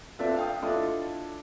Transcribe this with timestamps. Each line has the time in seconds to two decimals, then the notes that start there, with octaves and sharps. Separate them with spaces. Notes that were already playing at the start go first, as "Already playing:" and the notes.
0.19 C4 D4 F4 A4 D5 E5
0.36 F5 G5 D#6
0.62 D4 E4 F4 A4 D#5 E5